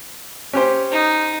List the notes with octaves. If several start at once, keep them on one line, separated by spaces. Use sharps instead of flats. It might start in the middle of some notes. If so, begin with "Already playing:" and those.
C#4 G4 C5
D#4